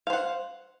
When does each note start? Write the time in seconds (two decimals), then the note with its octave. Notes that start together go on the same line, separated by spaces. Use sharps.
0.07 F5
0.10 C5
0.13 F#5